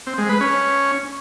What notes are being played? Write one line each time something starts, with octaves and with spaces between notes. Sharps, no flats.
C4
G#3
B4
C#4